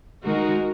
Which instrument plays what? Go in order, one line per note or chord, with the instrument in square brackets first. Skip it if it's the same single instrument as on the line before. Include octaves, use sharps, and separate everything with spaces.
[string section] D#3 G#3 D#4 F#4 A#4